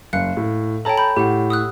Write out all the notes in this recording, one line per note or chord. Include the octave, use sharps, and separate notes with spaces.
F#1 F5 F#6 C#7
A2
A4 C#5 G5 A5 A#5
B5 G6
A2 G4 F#5
D#6 E6 F#6